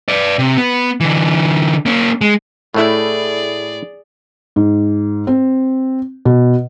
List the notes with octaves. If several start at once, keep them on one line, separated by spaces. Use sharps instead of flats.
B4 D5
C3
B3
D3 E3
A#3 C#4
G#3
A2 A3 E4 G#4 D5
G#2
C4
B2